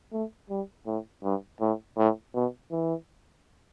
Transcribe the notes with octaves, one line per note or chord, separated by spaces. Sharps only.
A3
G3
A2
G2
A2
A2
B2
E3